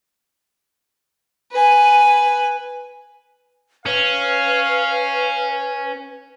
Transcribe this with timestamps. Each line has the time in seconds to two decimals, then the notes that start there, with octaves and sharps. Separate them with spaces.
1.52 B4 G#5
3.86 C#4 B4 F5